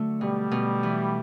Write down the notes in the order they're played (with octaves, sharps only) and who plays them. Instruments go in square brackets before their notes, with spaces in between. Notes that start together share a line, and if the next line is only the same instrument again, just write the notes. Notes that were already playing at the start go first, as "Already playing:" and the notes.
Already playing: [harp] D3 F#3 A3
[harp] B2 [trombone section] G3
[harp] B2
E3